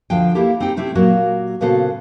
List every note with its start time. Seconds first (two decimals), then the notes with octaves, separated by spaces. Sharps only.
0.10 D2 F3 D4 G5
0.35 A#3 E4 G4 A4
0.60 C4 D#4 G4 G5
0.76 C3 A3 C4 C#4 E4 G4
0.95 A#2 F#3 A#3 F#4
1.61 A#2 C#3 B3 F#4 A4 C5